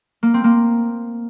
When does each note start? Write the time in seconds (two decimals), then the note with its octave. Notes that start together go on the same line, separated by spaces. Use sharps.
0.23 A#3
0.34 C4
0.44 A#3